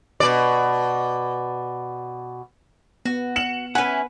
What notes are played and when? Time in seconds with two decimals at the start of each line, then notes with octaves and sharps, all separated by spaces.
0.20 B2 D5
3.05 B3 F#4
3.36 C#7 E7 F#7
3.75 C#4 E4 B4 F#5 G#5